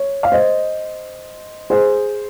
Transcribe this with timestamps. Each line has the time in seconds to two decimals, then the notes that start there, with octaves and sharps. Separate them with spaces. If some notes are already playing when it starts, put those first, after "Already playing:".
Already playing: C#5
0.23 F5
0.32 C5 D#5
1.70 G#4 C5